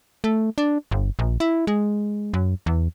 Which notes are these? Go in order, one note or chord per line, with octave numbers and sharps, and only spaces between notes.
A3
D4
G1
A#1
E4
G#3
F#2
E2